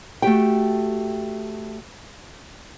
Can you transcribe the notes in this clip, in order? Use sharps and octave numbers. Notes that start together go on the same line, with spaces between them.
A3 F#4 G4 G5